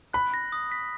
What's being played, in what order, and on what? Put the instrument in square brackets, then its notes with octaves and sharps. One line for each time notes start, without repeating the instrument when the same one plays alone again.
[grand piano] B5 [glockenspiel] F#6
[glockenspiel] A#6
D#6
B6